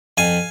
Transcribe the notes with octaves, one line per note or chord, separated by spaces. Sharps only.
F2 F5 G#5